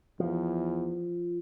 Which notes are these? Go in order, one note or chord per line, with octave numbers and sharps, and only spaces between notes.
E2 F3